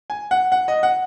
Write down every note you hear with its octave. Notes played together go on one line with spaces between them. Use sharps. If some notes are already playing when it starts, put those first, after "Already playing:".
G#5
F#5
F#5
D#5
F#5